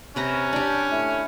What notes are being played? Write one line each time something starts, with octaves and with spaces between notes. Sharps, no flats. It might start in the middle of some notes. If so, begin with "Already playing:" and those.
C3 C#4 B4 A#5
D4 G4 A5
A3 E4